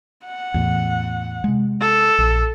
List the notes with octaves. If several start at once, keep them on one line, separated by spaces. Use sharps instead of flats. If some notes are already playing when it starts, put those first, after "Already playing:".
F#5
E2 A2
C3 G#3
A4
A#1